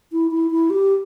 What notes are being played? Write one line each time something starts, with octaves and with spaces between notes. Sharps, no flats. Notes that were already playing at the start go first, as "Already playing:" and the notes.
E4
E4
E4
G4